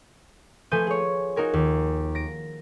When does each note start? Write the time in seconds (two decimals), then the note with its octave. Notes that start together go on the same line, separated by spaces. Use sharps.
0.71 F3 A3 B4 G#5 G6 D#7
0.87 G#4 C#5
1.36 D#4 F#4 A#4 G#5
1.53 D#2
2.15 A#6 D7